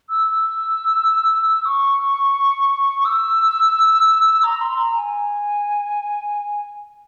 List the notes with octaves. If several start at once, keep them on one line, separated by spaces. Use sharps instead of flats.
E6
E6
C#6
E6
A#5
C6
A#5
G#5